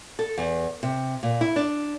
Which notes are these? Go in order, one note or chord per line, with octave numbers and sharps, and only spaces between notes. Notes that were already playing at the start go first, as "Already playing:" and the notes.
A4
E2
C3
A#2
E4
D4